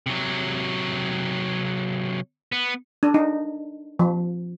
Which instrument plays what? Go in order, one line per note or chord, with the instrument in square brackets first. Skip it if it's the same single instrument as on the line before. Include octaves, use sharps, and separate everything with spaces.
[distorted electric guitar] C3 F#3
B3
[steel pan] D4
D#4
F3